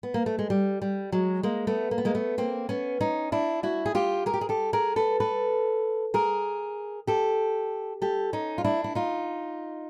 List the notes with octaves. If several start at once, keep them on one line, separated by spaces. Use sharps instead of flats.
B3
A#3
A3
G#3
G3
G3
F#3 G#3
G#3 A#3
A3 B3
A#3
B3
G#3 A#3
A3 B3
A#3 C4
B3 C#4
C#4 D#4
D4 E4
E4 F#4
G#4
F4 G4
G#4 A#4
G4
G#4
G4 A4
G#4 A#4
A4 B4
A4 B4
G#4 A#4
G4 A4
G4 A4
C#4 D#4
F4
D4 E4
E4
D#4 F4